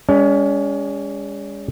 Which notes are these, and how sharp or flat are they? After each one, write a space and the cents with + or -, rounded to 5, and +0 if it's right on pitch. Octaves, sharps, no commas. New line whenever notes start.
G#3 -35 C#4 +35